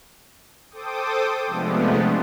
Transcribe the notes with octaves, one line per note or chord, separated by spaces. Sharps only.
A4 C5 G5 D6 D#6
C3 F3 G#3 A3 B3 D4